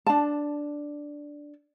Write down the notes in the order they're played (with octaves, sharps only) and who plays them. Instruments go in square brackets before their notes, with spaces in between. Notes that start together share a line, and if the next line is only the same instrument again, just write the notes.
[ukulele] D4 A5